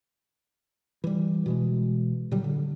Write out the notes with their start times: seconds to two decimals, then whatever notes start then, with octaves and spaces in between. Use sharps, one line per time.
1.04 E3 G3
1.46 B2 E3 G#3
2.31 A#2 D3 F#3 G3
2.44 D3